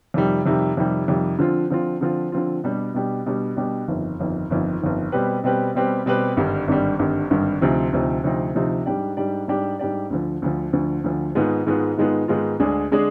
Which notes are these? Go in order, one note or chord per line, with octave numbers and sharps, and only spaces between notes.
F2 C3 D#3 G3
F2 C3 D#3 G3
F2 C3 D#3 G3
F2 C3 D#3 G3
D3 F3 C4 F4
D3 F3 C4 F4
D3 F3 C4 F4
D3 F3 C4 F4
B2 G3 D4 G4
B2 G3 D4 G4
B2 G3 D4 G4
B2 G3 D4 G4
G1 F2 D#3
G1 F2 D#3
G1 F2 D#3
G1 F2 D#3
B2 G3 C4 G4 B4
B2 G3 C4 G4 B4
B2 G3 C4 G4 B4
B2 G3 C4 G4 B4
G#1 G2 D3 G3
G#1 G2 D3 G3
G#1 G2 D3 G3
G#1 G2 D3 G3
D2 C3 F3 C4 D#4
D2 C3 F3 C4 D#4
D2 C3 F3 C4 D#4
D2 C3 F3 C4 D#4
G#2 G3 D4 G4 D5
G#2 G3 D4 G4 D5
G#2 G3 D4 G4 D5
G#2 G3 D4 G4 D5
D2 D3 F3
D2 D3 F3
D2 D3 F3
D2 D3 F3
G#2 D#3 G#3 B3 F4
G#2 D#3 G#3 B3 F4
G#2 D#3 G#3 B3 F4
G#2 D#3 G#3 B3 F4
D2 D3 G#3 D4 G#4
D3 G#3 D4 G#4